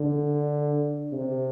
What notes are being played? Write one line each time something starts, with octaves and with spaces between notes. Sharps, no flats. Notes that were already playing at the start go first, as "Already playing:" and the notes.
Already playing: D3
C3